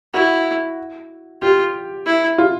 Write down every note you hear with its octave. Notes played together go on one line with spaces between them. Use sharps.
E4 F#4
F4 G4
E4
F4